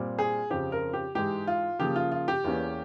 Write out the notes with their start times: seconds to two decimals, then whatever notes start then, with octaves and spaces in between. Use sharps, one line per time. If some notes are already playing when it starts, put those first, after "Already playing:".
Already playing: A#2 G3 C4
0.19 G#4
0.50 F2 C#3 F3 C4 G4
0.72 A#4
0.93 G4
1.15 G#2 E3 G#3 G4
1.47 F4
1.79 C#3 F3 A#3 G4
1.96 F4
2.12 F4
2.28 G4
2.44 E2 E3 A#3 C#4